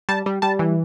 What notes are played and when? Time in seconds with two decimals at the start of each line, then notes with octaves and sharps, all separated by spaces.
0.09 G3 A5
0.26 G3
0.42 G3 A5
0.59 E3